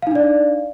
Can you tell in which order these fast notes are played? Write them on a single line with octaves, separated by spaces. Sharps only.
F5 D#4 D4 D5